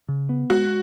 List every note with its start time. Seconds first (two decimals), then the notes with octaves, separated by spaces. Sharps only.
0.09 C#3
0.29 B3
0.50 G#3 F#4